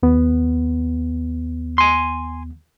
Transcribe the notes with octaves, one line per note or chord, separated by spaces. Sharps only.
D#2 B3
G#5 C6